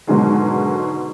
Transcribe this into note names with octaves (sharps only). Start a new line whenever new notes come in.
G#2 B2 D3 D#3 F#3 G#3